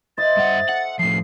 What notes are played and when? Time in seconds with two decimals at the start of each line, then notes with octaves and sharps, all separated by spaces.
0.18 C5 D#5 E5 A6
0.37 G2 F#5
0.69 A4 F#5
0.99 A2 F3 C7